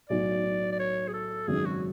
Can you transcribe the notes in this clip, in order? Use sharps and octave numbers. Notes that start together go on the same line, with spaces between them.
B1 A2 F#3 D5
D5
C#5
G#4
A4
G#1 F#2 C#3 F#3 G#4
F#4